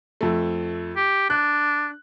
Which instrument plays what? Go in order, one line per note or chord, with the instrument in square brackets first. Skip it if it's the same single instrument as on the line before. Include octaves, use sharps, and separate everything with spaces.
[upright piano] F2 A3
[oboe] G4
[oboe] D4 [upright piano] F#6